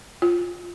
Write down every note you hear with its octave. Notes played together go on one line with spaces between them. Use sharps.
F4